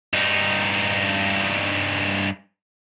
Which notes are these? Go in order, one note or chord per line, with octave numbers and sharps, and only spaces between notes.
G2 D#4